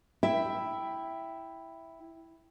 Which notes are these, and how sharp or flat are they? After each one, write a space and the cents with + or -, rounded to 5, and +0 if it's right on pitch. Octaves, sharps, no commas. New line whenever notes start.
E4 +0 E5 +0 G5 +0